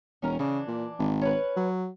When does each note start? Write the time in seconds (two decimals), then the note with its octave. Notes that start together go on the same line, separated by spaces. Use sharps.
0.22 E1 C#4 A#4
0.39 C#3 E3 D4
0.67 A#2
0.99 G#1
1.22 C#4 B4
1.56 F#3